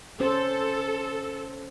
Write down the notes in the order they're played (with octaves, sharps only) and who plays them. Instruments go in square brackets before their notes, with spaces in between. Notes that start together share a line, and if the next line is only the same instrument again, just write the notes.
[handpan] C#4 C5 [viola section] A4